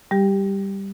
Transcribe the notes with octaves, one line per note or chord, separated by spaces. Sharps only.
G3 G4